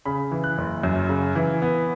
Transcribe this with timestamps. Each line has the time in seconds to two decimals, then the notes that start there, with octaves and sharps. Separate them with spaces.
0.06 C#3 B5
0.31 E3
0.44 F#6
0.58 F#1
0.83 F#2
1.09 C#3
1.35 E3
1.62 B3